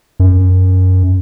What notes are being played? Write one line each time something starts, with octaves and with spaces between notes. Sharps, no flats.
F#2